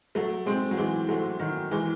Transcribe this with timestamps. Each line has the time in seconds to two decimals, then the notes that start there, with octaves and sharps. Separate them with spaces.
0.15 F#3 A3
0.46 G#3 C4
0.71 F#3
0.77 E3 G#3
1.09 F#3 A3
1.39 D#3 F#3
1.71 E3 G#3